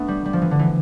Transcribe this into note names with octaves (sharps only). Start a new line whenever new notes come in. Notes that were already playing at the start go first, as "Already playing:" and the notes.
Already playing: A3 B3 D4
G3
G3
F3
E3
D3
E3